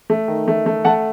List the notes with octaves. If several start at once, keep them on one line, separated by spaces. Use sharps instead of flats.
A3
D#3
A3
A3
A3 F#5 A5